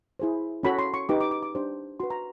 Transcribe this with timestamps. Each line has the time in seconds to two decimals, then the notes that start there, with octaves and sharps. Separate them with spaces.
0.19 E4 G#4 C5
0.63 C#4 F#4 A4 C#5 B5
0.79 C6
0.94 C#6
1.09 D#4 G4 B4 D6
1.21 D6
1.31 D6
1.43 D6
1.55 D4 G4 C5
2.00 F#4 B4 C6
2.10 A#5